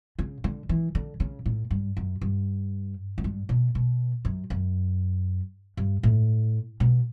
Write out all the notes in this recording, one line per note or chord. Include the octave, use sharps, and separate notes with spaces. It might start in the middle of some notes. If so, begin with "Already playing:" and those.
C#3
D3
E3
D3
C#3
A2
G2
F#2
G2
F#2
G2
B2
B2
F#2
F#2
G2
A2
B2